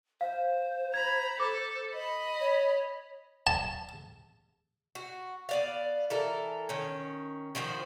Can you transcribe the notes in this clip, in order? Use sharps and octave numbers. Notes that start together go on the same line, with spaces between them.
C5 F5
A#5 B5 G#6
A4 D6
D#5 B5
C#5
A5
F#4
B3 D5 F5
E3 A4 A#4
D#3 C#4
D#3 F3 F#4 C5